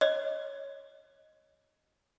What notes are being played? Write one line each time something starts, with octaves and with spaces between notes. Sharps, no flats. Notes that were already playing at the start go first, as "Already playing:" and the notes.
C#5 D#5